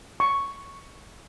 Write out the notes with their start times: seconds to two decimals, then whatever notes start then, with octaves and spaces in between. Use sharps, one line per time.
0.20 C#6